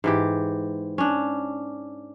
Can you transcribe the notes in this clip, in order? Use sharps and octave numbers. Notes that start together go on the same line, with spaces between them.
G#2 E3 G4
C#4 D4